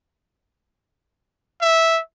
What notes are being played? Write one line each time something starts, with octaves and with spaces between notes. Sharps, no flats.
E5